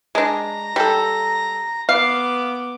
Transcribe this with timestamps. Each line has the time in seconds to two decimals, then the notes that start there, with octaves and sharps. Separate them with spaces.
0.15 G#3 D4 A#5
0.76 G3 A4
1.89 B3 F5 D6